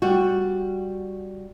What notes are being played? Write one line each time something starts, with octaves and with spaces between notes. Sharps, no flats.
G3 F#4